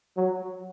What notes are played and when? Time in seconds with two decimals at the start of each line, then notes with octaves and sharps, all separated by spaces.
0.17 F#3